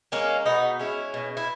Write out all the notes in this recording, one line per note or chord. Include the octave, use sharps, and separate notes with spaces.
G#3 A#3 C#4
B2 B3 D#4
G#3 C#4 E4
B2
E4